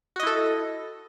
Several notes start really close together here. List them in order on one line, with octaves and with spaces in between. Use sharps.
F#4 D#5 E4 A4